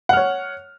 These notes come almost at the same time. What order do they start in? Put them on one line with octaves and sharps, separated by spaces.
F#5 F6 C#5